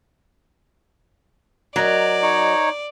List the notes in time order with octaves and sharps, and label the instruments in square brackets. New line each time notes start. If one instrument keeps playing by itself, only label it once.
[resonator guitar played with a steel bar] F#3 [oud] A#4 D#5 [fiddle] D5
[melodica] D#4 C#5